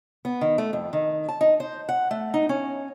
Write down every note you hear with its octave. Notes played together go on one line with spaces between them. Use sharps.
B3
D#3
A3
F2
D#3
A5
D#4
C5
F#5
A3
D#4
C#4